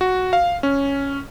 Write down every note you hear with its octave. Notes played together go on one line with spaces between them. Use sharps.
F#4
F5
C#4